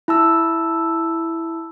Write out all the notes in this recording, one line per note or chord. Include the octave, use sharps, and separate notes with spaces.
E4 A5 E6